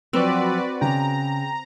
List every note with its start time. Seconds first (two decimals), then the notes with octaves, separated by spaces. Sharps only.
0.13 F3 F#3 C4 F#4 B4 D5 E6
0.81 C#3 G5 A#5